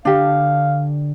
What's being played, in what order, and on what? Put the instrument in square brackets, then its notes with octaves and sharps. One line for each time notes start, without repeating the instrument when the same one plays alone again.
[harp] D3 [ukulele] D4 G4 [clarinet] F5